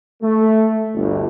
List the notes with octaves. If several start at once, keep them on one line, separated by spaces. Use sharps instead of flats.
A3
G1 D2